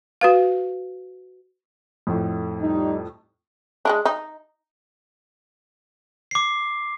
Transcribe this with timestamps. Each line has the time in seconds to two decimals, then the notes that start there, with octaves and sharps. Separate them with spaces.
0.21 F#4 B4 F5
2.07 F2 A2
2.62 G3 D#4
3.85 G#3 A#3 D4
4.05 D#4
6.31 D6 C7